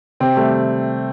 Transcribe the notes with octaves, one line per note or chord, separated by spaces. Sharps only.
C3 C4
G3 A3